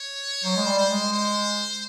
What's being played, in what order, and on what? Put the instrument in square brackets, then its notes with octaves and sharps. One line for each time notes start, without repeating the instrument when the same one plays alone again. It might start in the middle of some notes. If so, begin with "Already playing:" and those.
Already playing: [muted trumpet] C#5
[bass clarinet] F#3 [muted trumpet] C5
[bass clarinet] G#3
G3
[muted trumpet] C5
[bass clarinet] G#3
[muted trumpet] C5